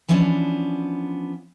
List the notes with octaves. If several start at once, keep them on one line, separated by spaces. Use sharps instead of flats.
E3 F3 B3 C#4 D4